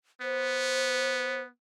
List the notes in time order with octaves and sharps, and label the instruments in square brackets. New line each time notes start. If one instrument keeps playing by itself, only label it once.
[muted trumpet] B3 [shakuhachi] C5